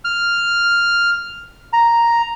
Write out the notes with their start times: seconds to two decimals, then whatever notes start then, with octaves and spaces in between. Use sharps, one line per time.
0.05 F6
1.73 A#5